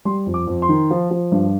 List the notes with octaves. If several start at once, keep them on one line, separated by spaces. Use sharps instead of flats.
G3 C6
F2
D6
F2
C6
D#3
F3
F3
G2